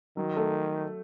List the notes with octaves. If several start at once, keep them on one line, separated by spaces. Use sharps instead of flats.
D#3 F#3
A3